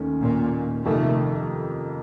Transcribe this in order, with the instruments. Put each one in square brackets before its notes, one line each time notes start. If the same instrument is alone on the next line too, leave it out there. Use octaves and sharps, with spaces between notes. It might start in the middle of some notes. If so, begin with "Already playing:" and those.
Already playing: [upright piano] D#2 D#3 A3 C#4
[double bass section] A#2
[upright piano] F2 C3 D#3 A#3 D#4 [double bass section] A3